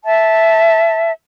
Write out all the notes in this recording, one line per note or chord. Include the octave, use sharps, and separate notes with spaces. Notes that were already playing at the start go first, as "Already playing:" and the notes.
E5 A5